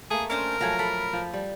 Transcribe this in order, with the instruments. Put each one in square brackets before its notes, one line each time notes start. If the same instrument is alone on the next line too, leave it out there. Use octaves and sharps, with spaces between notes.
[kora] A3 A#3 [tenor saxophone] G#4
[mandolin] C#4 D4 C5 [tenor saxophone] A#4
[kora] F3 F#3 A3 [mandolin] G#5 A#5
[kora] A4 [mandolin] B5
[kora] F3
G3